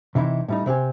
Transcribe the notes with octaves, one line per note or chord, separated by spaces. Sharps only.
C3 E3 D#4 E4
A2 G3 D#4
C3 C4 G4 G#5